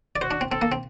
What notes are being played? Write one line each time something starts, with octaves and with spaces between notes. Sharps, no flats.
D5
F#4 C5
D4
C4
C4 A4
A#3
C4